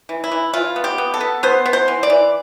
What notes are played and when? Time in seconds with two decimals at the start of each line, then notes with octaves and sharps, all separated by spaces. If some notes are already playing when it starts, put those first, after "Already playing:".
0.09 E3
0.24 E4
0.32 E3
0.53 E3 F4
0.76 B3
0.84 G4
0.98 B3
1.14 A4
1.21 B3
1.43 B3 C5
1.66 B3
1.73 C5
1.88 E3
2.03 D5
2.10 E3